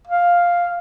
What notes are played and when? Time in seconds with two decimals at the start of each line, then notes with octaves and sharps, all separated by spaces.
0.07 F5